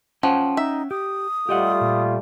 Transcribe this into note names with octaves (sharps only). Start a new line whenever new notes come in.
F3 C#4 F#5 G5
D#4 E5
G4 D#6
G3 A3 F4 G4 D#5 F#5
A#2